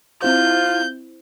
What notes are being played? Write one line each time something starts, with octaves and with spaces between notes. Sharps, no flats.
C4 E4 F4 C5 G6